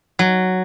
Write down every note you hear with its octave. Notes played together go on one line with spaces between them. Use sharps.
F#3